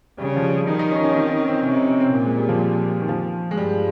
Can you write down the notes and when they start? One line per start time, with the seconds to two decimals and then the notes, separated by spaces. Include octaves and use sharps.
0.18 C#3 G3
0.36 F3
0.43 G3
0.67 D#3 D#4
0.79 D#4
0.92 C#4
1.04 C#4
1.15 C4
1.32 C#4
1.48 C4
1.63 C3 C#4
1.76 D#4
1.89 C#4
2.00 C4
2.13 A#2 A#3
2.24 G#3
2.37 G3
2.49 F3
3.01 D#3
3.09 F3
3.51 G#3
3.57 G2 G3